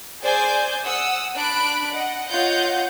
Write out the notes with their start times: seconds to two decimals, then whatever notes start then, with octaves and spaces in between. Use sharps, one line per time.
0.22 G#4 C5 D5 G#5 G6
0.85 F#5 D#6 E6
1.37 D4 B5 F#6 D7
1.91 D#5 F#5
2.28 F4 C#5 D#5 F5 F#5 G6